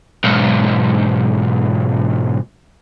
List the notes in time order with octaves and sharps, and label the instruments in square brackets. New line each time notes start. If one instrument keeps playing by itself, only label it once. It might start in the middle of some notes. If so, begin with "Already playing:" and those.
[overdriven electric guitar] B1 G#2